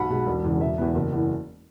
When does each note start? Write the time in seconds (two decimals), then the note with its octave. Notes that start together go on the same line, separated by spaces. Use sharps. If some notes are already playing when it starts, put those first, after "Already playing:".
Already playing: B1 F#5 B5
0.10 B2 G#3
0.26 E1
0.44 E2 C#3
0.60 E1 E5
0.78 E2 E3 B3
0.95 F#1
1.12 E2 E3